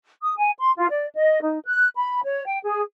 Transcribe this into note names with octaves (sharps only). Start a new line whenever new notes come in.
D#6
G#5
C6
F4
D5
D#5
D#4
F#6
B5
C#5
G5
G#4